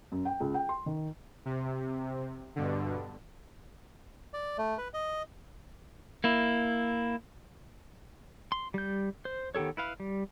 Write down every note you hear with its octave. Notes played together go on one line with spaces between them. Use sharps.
F#2
G5
C#2
G5
C6
D#3
C3
G2 B2 D3
D5
A3
B4
D#5
A#3 E4
C6
G3 G6
C5
D#3 B3 G4 A4 C#5
E4 B4 F5
G3